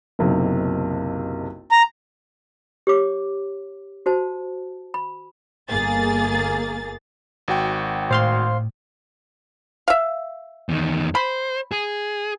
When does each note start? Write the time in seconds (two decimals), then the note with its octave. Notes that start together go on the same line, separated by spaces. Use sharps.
0.19 F#1 B1 C3
1.71 A#5
2.87 G4 C#5 D6
4.06 F#4 C5 A5
4.94 B5
5.69 G1 A#3 G#4 A6
7.48 G#1 F#4 G5
8.11 A2 C5 F5 C6
9.88 E5 F5
10.69 E2 D#3
11.15 C5 B5
11.72 G#4